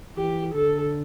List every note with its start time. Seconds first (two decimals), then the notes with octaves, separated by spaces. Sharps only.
0.17 E3 G4
0.54 D3 A4